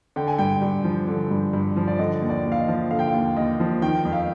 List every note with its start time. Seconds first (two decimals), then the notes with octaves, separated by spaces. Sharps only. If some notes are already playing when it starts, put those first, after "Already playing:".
0.16 D3 G5
0.27 G#5
0.39 G2 G5
0.62 G2
0.84 F3
1.08 D3
1.31 G2
1.53 G2
1.76 F3
1.88 D5
1.99 D3 D#5
2.22 D#2
2.30 D5
2.46 D#2
2.52 F5
2.60 D#5
2.68 F3
2.91 D3 F5
2.99 G5
3.07 F5
3.14 D#2
3.37 D#2 D#5
3.60 F3
3.82 D#3 G5
4.05 F2
4.13 F5